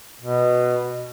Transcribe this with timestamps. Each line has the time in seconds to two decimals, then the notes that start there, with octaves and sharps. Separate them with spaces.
0.21 B2